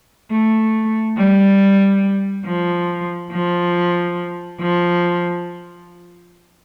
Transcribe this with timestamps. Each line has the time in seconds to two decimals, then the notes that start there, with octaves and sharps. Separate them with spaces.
0.31 A3
1.17 G3
2.45 F3
3.31 F3
4.60 F3